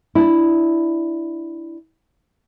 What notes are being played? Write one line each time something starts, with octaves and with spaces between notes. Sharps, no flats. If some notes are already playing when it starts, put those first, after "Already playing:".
D4 E4